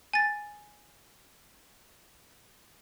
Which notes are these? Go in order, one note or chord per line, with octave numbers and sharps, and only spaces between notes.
G#5 A6